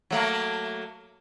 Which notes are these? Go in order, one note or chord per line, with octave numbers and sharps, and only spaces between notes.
F#3 A3 A#3